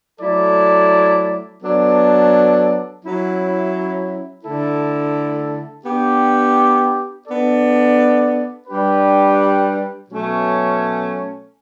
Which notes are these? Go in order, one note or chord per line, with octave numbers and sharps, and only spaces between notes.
F#3 A3 E4 A4 D5
F#3 B3 D4 A4
F#3 C#4 E4
D3 A3 E4 A4
B3 D4 G4
B3 D4 A4 D5
G3 D4 G4 B4
B2 F#3 A3 C#4